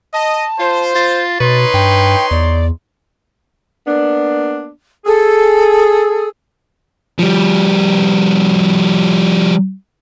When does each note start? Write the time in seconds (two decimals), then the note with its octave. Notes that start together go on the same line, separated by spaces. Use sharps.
0.14 D#5 A5
0.60 F4 C5
0.95 F4 A6
1.40 B2 D#4 B4 C#5 C6
1.74 G2 G5
2.31 E2 D5
3.87 A#3 B3 D4
5.05 G#4 A4 E6
7.19 F3 G3